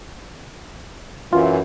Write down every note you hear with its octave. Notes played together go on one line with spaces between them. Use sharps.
F#2 E3 F4